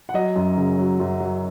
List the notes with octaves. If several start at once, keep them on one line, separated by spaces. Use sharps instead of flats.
F#5
F#3 D#5
F#2
C#3
F#3
F#2
F#3